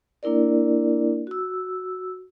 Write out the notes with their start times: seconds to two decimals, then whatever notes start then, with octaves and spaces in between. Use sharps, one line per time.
0.23 A#3 D4 E4 A#4 D5
1.27 F#4 E6